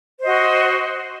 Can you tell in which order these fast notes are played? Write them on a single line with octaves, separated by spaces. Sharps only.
C5 D#5 F#4